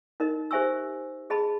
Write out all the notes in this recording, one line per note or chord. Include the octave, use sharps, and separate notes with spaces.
D#4 A#4 D#5
G4 C5 E5 G#5 C#6 E6
G#4 D#5 A5 B5